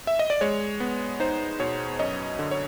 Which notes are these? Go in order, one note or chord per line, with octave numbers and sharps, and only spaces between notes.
E5
D#5
D5
G#3 C#5
B3
D#4 C5
B2 C#5
F#2 C#5 D#5
D3
C#5